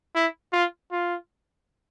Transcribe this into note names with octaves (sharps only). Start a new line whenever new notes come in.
E4
F4
F4